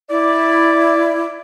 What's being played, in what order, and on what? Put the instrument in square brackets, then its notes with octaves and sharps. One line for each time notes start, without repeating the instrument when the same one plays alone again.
[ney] E4 [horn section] D5